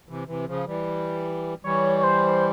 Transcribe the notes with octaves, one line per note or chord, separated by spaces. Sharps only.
C3 E3
C3 E3
C#3 F3
E3 G3
E3 G3 C#5
C#5
C5